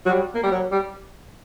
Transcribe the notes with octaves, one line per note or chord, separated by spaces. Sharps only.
F#3
G3
A#3
G3
F#3
G3